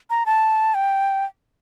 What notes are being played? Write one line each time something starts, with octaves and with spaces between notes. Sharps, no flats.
A#5
A5
G5